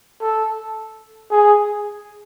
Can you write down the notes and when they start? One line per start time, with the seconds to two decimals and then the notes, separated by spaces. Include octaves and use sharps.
0.21 A4
1.31 G#4